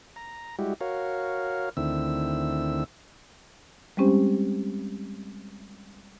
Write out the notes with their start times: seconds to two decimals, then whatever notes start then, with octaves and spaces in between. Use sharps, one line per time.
0.16 A#5
0.59 G3 G#3 E4 F#4 G4
0.81 F#4 A#4 C#5 F5
1.77 D2 D3 D#3 C4 E4 E6
3.97 G3 G#3 C4 C#4 G4 C5